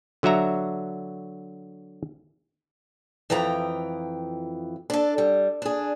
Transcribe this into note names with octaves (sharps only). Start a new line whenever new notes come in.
D3 F#3 F#4 E5 A#5
F2 E3 F3 G5 A#5
D4 A4
G3
D4 G#4